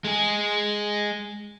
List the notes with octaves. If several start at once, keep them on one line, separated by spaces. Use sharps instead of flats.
G#3 G#4